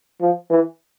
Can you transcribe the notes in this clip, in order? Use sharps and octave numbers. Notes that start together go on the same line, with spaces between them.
F3
E3